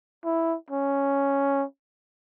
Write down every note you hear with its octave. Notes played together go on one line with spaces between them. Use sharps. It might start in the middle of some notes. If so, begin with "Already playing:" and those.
E4
C#4